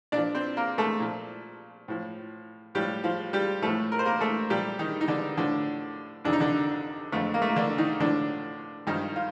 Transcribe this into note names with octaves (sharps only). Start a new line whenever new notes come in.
A#2 D4 D5
F3
C4 C5
A#3 A#4
A3 A4
A#2 F3
A2 F3
A2 F3 G3 G4
F3 F4
G3 G4
A2 F3 A3 A4
A#4
C5
A#3 A#4
A3 A4
A#2 F3 G3 G4
D#3 D#4
D#4
D3 D4
A2 D3 F3 D4
F2 C3 D#3 D4
D#4
D3 D4
F2 D3 F3 A3
A#3
A3
A#3
D3 D4
D#3 D#4
A2 D3 F3 D4
G2 D#3 F3 D#4
F4